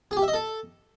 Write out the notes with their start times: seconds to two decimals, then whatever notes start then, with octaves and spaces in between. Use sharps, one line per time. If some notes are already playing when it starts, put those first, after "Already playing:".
0.11 G#4
0.17 G4
0.22 E5
0.28 D#5
0.34 A4